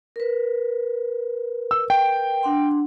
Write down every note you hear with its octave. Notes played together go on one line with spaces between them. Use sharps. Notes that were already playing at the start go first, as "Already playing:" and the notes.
A#4 B4
E6
G5
D4 F#5 C6